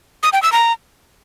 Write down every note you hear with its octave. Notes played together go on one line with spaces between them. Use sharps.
D#6
G5
E6
A#5